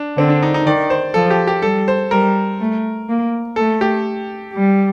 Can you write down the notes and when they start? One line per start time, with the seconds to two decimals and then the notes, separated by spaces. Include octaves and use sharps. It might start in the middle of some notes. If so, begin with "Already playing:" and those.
Already playing: D4
0.17 D3 C4
0.29 D4
0.42 D#4
0.54 D#4
0.66 D#3 D5
0.90 C5
1.14 F3 A4
1.30 G4
1.47 G4
1.62 G3 A4
1.88 C5
2.11 G3 A#4
2.60 A3
3.09 A#3
3.56 A3 A4
3.81 G4
4.54 G3